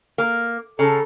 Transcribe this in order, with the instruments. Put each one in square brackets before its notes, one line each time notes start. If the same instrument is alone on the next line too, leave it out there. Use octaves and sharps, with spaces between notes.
[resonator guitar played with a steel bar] A#3
[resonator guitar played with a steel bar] C#3 [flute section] A4 A#5